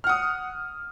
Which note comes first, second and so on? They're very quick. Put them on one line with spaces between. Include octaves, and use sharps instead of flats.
F6 F#5 D#6